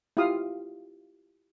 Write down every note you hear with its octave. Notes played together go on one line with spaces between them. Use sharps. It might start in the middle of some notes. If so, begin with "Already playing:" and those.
E4 F4 G4 F5 D#6